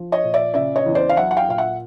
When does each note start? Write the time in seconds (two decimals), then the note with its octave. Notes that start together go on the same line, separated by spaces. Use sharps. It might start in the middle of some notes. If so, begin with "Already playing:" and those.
Already playing: F3
0.12 C#5 D#5
0.24 A#2
0.34 D5 E5
0.54 C#3 D5 E5
0.76 C#5 D#5
0.86 E2
0.95 C5 D5
1.09 F5
1.16 F#3 E5 F#5
1.31 F#5
1.37 F5 G5
1.48 A#2 F5
1.58 E5 F#5